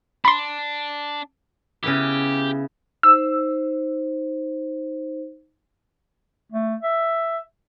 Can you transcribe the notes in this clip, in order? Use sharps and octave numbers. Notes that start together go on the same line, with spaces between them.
D4 B5 C6
C#3 B3 E4 G4
D#4 C5 E6
A3
E5